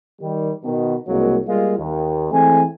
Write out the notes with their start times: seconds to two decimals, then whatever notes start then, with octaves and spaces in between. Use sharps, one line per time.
0.22 D#3 G3
0.64 B2 D#3
1.08 C2 B2 F#3 G#3 A#3
1.47 G3 G#3 A#3 F4
1.78 D#2
2.32 E3 G#3 A3 C4 G#5